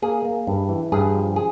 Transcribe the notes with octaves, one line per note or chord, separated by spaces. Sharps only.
A#3 G#4
A#3
G2
E3
G2 G#4
F3
G#4